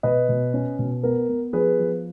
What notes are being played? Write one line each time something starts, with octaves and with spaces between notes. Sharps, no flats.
B2 B4 D#5
B2
C#4
B2
B3 A#4
B3
F3 G#4 B4
F3